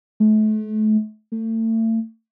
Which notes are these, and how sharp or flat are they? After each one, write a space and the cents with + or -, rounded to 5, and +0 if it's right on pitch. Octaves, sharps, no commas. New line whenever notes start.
A3 -35
A3 +35